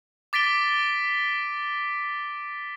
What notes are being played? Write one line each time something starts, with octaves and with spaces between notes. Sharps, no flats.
D6 A6 B6 D7 G7